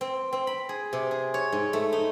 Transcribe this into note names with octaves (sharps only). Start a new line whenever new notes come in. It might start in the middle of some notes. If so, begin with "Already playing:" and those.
C4
C4
B5
G#4
C3
G#4
C#5
G#2
A3
D#4